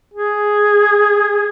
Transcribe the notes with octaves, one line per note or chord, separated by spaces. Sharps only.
G#4